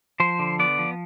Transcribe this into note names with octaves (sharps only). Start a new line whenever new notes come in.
F3 C5
D3
B3 D5
F3